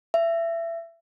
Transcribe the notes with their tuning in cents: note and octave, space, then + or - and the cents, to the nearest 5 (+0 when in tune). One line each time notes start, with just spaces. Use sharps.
E5 +25